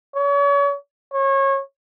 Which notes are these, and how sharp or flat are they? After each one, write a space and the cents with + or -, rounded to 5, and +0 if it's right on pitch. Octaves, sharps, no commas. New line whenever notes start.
C#5 +35
C#5 -25